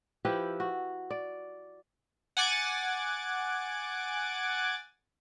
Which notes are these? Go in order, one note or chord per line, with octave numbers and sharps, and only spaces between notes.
F3 E4 G4 B4
F#4
D5
F#5 G#5 D6 A6